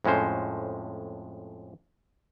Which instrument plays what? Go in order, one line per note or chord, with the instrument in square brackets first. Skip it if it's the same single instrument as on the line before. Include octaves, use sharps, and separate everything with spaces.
[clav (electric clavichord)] F2 A2 G#3 C#4 C5